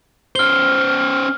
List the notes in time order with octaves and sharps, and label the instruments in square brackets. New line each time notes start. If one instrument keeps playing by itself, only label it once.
[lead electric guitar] C#4 C5 [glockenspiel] F6 G7